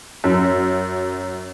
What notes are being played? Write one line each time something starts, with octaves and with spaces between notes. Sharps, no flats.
F#2